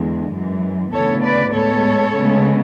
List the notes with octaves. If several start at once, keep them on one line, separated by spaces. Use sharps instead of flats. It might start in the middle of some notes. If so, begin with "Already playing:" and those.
Already playing: E2 D3 G#3
F#2 E3 G#3
D2 C#3 E3 B3 A4 C#5
B4 D5
A2 G#3 B3 A4 C#5
D2 C#3 G#3 B3